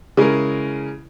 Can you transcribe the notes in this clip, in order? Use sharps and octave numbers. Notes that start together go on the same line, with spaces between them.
C#3 G#3 E4 A#4